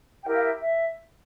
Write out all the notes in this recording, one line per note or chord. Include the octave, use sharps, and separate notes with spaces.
E4 G4 A#4 G5
F5
E5
E5